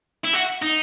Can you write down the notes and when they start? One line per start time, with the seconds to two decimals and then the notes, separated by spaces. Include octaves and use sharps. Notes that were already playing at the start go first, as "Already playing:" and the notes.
0.25 E4
0.34 F#4
0.62 D#4